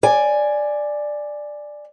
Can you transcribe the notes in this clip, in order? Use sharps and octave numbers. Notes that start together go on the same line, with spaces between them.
D5 G#5